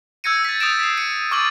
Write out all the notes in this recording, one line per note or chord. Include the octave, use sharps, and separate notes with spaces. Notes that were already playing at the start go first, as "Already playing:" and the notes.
E6 G6 G#6 A#6 C#7 D#7
A6 B6
D#6 G6 A6 A#6 D7 E7
B6 C7
C#7 D#7
C#6 D6 F6 A6 F#7